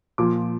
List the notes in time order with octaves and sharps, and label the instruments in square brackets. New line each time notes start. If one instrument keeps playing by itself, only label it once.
[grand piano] A#2 F3 D6